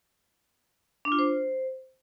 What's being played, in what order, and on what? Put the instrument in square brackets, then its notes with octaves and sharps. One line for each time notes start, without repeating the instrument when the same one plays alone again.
[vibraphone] D4
F4
C5